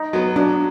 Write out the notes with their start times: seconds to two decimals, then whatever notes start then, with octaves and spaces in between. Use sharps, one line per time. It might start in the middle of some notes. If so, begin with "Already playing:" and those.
Already playing: D#4
0.13 F#3 B3
0.36 F#3 D4